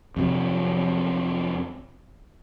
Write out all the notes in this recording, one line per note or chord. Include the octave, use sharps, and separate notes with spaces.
F2 C3 F#3